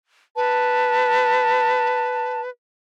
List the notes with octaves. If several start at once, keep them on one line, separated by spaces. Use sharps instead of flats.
B4 A5